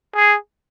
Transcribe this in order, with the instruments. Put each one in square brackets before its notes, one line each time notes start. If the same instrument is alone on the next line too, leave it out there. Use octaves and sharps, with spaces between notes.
[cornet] G#4